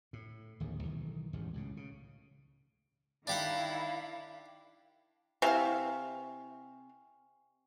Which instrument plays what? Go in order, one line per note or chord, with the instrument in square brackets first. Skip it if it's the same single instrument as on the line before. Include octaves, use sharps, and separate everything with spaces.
[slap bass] A2
D1 A#1 D#2 D#3
B1 D#3 E3
E1 A1 G#2 D#3
C#2 A2 C#3
C#3
[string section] D#3 E4 [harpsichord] D4 G4 F#5 [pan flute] F5
[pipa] C3 F5 [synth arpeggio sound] E4 E5 [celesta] G5 G#5 C#6